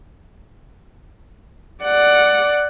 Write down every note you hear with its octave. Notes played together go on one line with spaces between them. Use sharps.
D5 F#5